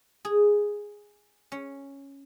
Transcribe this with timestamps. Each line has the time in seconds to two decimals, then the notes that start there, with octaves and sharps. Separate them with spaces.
0.25 G#4
1.52 C#4